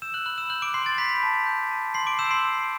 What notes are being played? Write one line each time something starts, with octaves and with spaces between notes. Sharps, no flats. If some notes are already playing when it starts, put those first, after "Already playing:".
E6 G6 E7
F#6 F#7
B5 F#6 F#7
E6 E7
F#6 G6 F#7
D6 D7
C6 G6 C7
A6
B5 G6 B6
A5
G6
A5
C6 C7
D6 D7
E6 G6 E7
C6 C7
C6